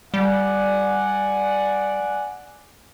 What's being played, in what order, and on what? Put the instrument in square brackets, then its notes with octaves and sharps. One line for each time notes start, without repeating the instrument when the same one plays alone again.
[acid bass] G3 [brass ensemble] D5 F#5 G#5